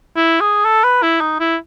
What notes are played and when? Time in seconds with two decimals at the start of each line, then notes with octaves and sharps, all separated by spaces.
0.16 E4
0.40 G#4
0.65 A4
0.84 B4
1.02 E4
1.21 D#4
1.40 E4